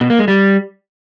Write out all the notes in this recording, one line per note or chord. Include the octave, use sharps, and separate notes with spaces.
B2
A#3
G#3
G3